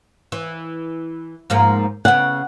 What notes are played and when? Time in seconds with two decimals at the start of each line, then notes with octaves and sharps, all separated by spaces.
0.32 E3
1.50 G#2 F3 A#3
2.05 C#3 B3 F#5